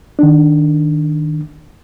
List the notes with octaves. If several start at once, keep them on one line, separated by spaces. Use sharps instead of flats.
D#3 D4